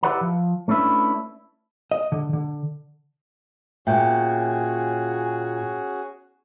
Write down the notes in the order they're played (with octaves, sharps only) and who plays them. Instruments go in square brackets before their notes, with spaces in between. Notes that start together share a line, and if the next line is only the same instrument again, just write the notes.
[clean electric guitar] E4 G4 B4 D5 F#5 A#5
F3
A3 C#4 D4 E4 B4
[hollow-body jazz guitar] D#5
D3
D3
[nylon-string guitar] A#2 [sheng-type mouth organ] C#4 F#4 G#4 [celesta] E5 G5 G6